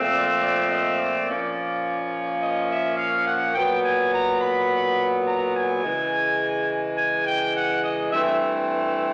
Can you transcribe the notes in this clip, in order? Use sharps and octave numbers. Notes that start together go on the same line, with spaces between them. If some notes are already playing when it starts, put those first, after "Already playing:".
Already playing: A#2 F3 A3 C4
D5
D5
D#5
D5
A#2 F3 A#3 C#4
D#5
E5
F5
F#5
A#2 F#3 B3 G5
G#5
A#5
B5
A#5
G#5
C#3 E3 G#3
G#5
G5
F#5
D#5
G2 E3 A3 C4 E5